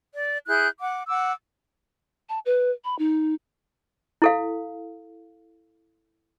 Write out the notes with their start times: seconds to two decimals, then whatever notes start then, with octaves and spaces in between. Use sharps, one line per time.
0.15 D5
0.47 E4 G#4 F#6 G6
0.80 F#5 D6
1.08 F#5 D6 E6
2.29 A5
2.46 B4
2.84 B5
2.99 D#4
4.22 E4 A4 F5